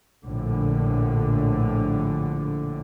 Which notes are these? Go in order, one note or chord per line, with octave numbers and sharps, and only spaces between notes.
A#1 A2 D3